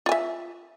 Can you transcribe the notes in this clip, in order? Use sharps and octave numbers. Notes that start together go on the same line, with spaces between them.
F4 E5 G#5